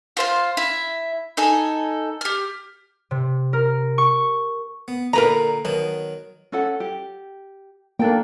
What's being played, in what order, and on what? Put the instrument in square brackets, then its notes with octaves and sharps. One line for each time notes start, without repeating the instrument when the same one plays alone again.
[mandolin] F4 C5 F5
E4 E5
D#4 A4 G#5
G4 F6
[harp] C3
A#4
C#6
[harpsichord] B3
[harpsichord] A#2 D3 [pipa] A#4 B4 A#5
[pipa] B2 [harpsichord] D#3 F#3
[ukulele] C#4 A4 F#5
G4
[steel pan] A#3 [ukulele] D4 A4 G5